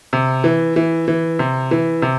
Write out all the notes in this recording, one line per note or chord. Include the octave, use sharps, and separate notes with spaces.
C3
E3
E3
E3
C3
E3
C3